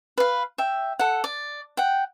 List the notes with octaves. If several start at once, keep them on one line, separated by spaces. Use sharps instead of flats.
B4 F5
E5 G5
A4 F#5
D5
F#5 G5